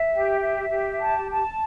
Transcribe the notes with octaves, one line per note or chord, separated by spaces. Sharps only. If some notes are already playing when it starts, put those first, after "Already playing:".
Already playing: E5
G4
E5
G4
A5
A5